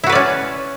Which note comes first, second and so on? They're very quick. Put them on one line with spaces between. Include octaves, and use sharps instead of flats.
E4 F#4 B4 D5 C#4